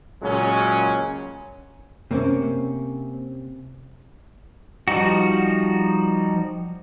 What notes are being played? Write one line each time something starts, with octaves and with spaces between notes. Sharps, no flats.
A#2 C#3 F#3 G#3 C#4
C3 A#3 C4 C#4
F3 G3 D#4 F#4